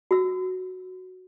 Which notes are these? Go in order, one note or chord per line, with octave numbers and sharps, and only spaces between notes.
F#4 E6